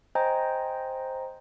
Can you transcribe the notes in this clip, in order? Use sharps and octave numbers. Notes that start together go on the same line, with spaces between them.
C5 D#5 G5 G#5 A#5